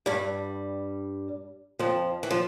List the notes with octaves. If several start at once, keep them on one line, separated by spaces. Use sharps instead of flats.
G2 G3
F2 F3
E3
F3